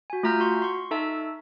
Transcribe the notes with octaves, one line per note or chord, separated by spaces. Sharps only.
F#4 G#5
A3 F4 E5 A#5 F6 G6
F#4 C6 C#6
C6 C#6
D#4 A4 E5 A5